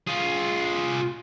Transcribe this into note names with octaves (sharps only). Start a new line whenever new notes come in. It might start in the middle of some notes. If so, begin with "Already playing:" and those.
F4 G#4